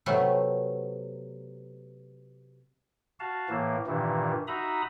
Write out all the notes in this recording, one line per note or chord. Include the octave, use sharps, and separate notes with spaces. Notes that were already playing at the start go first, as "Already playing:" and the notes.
C3 F#3 A3 B3
F#4 F5 A5
A2 E3 A#3
G2 A#2 D#3 E3
D#4 F#4 E5 A#5 B5 D#6